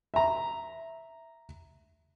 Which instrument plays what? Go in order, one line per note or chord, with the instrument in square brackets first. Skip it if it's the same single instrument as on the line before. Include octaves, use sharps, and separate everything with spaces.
[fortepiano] E5 A#5